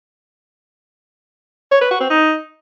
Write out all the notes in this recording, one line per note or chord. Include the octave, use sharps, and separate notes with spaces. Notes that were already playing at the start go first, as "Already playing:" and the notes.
C#5
B4
F#4
C4
D#4